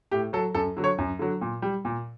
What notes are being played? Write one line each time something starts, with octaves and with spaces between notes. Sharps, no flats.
A2 G4
F#3 A4
F#2 A4
D3 F#3
C#5
F#2
D3 F#3
A#2
G3
A#2